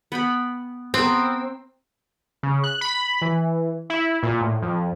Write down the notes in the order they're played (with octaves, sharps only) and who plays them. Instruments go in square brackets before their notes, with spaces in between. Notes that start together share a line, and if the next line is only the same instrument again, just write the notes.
[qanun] B3 G5 B5
[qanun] B3 A#4 [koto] C4
[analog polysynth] C#3
F#6
B5
E3
E4
A#2
A2
F2